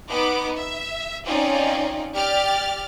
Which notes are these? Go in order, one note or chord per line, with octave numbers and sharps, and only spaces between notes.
B3 D#4 D6
E5
C4 C#4 D#4 F4 D5
G4 D5 F6 A6